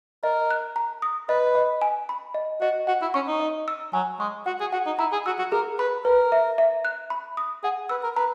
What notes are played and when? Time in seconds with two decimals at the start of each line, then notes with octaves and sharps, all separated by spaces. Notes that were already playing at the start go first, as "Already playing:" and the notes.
0.24 A#4 D#5
0.51 F#6
0.76 A#5
1.02 D#6
1.29 B4 D#5
1.55 D#5
1.81 G#5
2.09 B5
2.34 D#5
2.61 F#4 D#5
2.87 F#4 F#5
3.02 E4
3.14 C#4 C#6
3.28 D#4
3.40 D#5
3.68 E6
3.93 F#3 G#5
4.19 G#3 C#6
4.46 F#4 F#5
4.60 G#4
4.73 F#4 F#5
4.86 D#4
4.99 E4 A#5
5.12 G#4
5.26 F#4 E6
5.38 F#4
5.52 G#4 A#4
5.79 B4 B5
6.05 A#4 B4
6.32 E5
6.58 E5
6.85 F#6
7.10 B5
7.37 D#6
7.63 G#4 F#5
7.89 B4 E6
8.03 A#4
8.16 B4 A#5